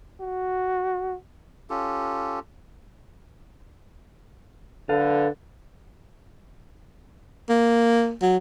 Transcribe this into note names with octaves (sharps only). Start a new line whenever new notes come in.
F#4
C#4 F4 G4 A4
D3 A4 B4 F5
A#3
F#3